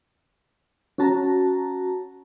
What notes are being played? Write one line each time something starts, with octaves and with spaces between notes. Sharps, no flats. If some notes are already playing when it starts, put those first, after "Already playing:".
C#4 F#4 A5 A#5